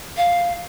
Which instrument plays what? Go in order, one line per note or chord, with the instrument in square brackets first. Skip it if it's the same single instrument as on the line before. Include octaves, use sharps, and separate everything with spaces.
[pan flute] F5